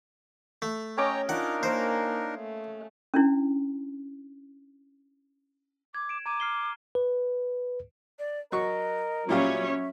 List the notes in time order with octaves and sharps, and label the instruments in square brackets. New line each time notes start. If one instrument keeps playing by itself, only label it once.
[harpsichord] A3
[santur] C#4 D#5 D6 [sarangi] C#5 [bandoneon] G5 A#5
[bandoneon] D4 D#4 A#4 [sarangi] F4 [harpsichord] F#5
[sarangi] A#3 [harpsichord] C5
[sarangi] A3
[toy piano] C#4 D4 E4
[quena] D6 [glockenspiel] G#6
[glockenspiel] D7 E7
[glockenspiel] A#5 G#6 D#7 [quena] D6
[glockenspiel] F6 C7 G7
[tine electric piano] B4
[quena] D5
[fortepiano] F#3 C#6 [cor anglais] A#4 [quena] D#5
[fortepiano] A#2 G3 F5 [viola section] F#3 C#4 C#5 [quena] E5